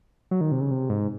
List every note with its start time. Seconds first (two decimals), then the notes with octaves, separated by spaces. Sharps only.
0.31 F#3
0.41 D#3
0.52 C3
0.61 C#3
0.71 C3
0.89 G#2